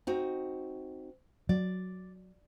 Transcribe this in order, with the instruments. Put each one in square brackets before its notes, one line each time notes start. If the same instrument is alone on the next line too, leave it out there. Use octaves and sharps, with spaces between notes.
[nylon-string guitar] C4 D#4 F#4
[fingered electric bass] F#3 [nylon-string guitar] D5